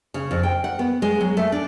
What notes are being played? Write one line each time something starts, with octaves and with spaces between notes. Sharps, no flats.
C#3
F2
G5
F#5
B3
G#3
F#3
A3
D4